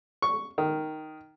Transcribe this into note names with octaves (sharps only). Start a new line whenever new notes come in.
C#6
D#3